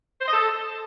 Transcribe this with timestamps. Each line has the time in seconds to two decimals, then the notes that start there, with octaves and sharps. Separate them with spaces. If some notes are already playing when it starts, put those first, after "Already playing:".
0.20 C5
0.26 D#5
0.31 A4